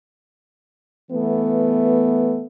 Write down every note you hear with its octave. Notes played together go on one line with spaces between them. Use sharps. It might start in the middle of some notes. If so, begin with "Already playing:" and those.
E3 A3 B3